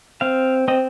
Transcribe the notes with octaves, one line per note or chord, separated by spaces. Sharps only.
C4 F5
C4 D#5